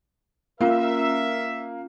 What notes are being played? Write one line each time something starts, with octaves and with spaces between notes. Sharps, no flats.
A#3 C#4 F4 A#4 E5